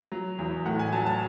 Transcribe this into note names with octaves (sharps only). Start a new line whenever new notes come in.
F#3
E2
A2 F#5
G#5
F#3 A5
A5